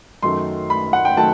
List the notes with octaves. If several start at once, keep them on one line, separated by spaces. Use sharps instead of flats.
F#2 D#3 F#3 A3 C6
B5
F#5
G5
D#3 F#3 A3 A5